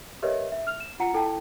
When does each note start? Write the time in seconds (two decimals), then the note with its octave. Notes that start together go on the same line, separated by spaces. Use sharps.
0.22 G4 A#4 B4 C#5 D#5 E5
0.52 E5
0.67 F6 F7
0.80 E7
1.00 F4 F#5 A#5 C#7
1.13 E4 A4 G5 A5